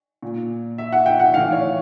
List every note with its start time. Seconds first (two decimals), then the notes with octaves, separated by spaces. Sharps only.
0.22 A#2
0.78 E5
0.92 F#5
1.06 G5
1.20 F#5
1.34 A2 E3 F5
1.52 C#5